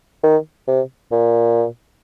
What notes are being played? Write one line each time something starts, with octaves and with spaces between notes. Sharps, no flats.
D#3
C3
A#2